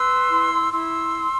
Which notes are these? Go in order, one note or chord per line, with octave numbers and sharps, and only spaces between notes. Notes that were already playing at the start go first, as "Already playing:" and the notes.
Already playing: B4 C6 E6
E4
E4 C6 E6